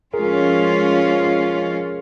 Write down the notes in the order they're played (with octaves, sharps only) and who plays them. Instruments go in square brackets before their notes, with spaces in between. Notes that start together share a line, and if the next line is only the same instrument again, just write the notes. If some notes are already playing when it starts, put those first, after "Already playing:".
[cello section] F3 G#3 C#4 F4 [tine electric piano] G#4 A#4